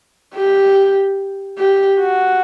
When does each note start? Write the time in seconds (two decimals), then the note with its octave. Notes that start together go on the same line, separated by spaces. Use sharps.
0.34 G4
1.58 G4
2.00 F#4